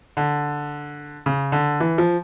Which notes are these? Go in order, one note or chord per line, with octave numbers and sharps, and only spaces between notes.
D3
C#3
D3
E3
F3